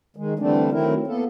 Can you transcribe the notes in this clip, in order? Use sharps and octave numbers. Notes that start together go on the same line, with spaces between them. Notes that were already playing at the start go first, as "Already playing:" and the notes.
D#3 G#3
D3 E3 G3 A3 C4 D4
D#3 F#3 A3 C4 E4 A#4
A#3 B3 A4